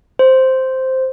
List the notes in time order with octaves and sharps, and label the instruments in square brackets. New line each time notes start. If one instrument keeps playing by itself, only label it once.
[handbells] C5